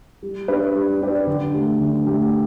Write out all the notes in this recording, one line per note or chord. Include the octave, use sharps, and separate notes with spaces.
G3
D4 G4 B4 D5
G3
D4 G4 B4 D5
D3
A3 G4
D3
A3 G4